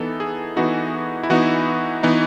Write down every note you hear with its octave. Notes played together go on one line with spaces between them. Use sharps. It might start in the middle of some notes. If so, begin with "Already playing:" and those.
Already playing: E3 B3 D#4 A4
G#4
E3 B3 D#4 F#4
E4
E3 B3 D#4 F#4
E3 B3 D#4